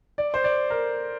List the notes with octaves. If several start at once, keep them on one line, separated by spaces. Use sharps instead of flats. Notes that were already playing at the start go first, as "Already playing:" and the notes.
D5
C5
D5
A#4